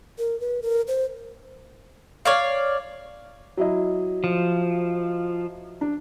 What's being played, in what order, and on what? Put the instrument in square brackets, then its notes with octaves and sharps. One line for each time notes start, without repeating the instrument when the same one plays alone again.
[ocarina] A#4
B4
A#4
C5
[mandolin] C#5 D5 F5
[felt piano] F#3 E4 D#5
[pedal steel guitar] F3
[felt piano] D4